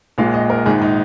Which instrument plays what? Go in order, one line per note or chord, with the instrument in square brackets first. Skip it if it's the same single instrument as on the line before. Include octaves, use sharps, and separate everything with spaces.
[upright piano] A#1 A#2 G#3 F5
D#5
A#4
A#1 G#2 D#3 G#4
D#4